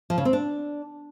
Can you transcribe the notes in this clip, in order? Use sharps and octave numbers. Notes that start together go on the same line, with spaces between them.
F3
C#3
C4
D4